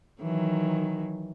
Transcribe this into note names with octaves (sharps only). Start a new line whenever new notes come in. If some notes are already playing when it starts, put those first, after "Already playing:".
D#3 E3 F#3